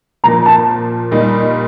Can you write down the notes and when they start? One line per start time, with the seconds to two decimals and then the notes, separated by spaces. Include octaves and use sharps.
0.24 A#2 F3 A#3 A#5
0.46 A5
1.11 A#2 G3 A#3 D#4